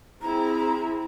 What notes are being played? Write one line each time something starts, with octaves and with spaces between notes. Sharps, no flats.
C4 E4 G#4 A#5